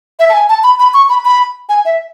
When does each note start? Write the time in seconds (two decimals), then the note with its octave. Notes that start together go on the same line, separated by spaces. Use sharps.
0.19 E5
0.29 A5
0.33 G#5
0.49 A5
0.64 B5
0.79 B5
0.94 C#6
1.10 B5
1.25 B5
1.69 G#5
1.85 E5